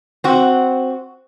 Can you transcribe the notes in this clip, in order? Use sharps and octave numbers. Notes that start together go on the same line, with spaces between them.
C4 F#4